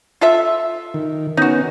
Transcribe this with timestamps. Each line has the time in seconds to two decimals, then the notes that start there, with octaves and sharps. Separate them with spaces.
0.21 F4 A4 E5
0.94 D#3
1.37 D#3 B3 C#4 D#4 F#4